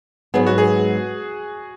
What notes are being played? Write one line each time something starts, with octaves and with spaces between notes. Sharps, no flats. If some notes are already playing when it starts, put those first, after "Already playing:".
G#2 F#3 B3 G#4
F#4
G#4